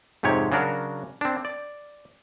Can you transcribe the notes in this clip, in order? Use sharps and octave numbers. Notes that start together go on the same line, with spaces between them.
F2 G#2 C3 G4 C#5
C#3 F#3 D4 F#4 A#4
C4 D4
D5